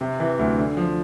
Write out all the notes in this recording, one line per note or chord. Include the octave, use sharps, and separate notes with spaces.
C3
E3
D2
D3
F3